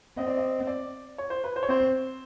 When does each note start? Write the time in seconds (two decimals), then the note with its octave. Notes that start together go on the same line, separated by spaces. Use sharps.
0.17 C4 D#5
0.27 D5
0.37 D#5
0.67 D5
1.18 C#5
1.30 C5
1.44 B4
1.56 C5
1.63 C#5
1.68 C4 C5